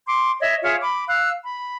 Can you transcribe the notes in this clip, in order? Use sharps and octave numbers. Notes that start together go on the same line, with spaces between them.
C6 D6
C#5 D#5 E5
F4 G#4 C#5 E5
B5 D6
F5 E6 F#6
B5